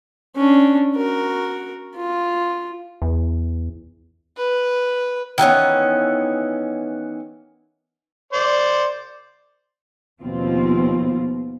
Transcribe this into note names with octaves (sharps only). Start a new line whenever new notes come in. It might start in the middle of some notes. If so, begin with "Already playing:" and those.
C#4 D4
F#4 A#4
F4
E2
B4
D#3 E3 B3 C#4
C5 D5
D#2 B2 F3 C4 F4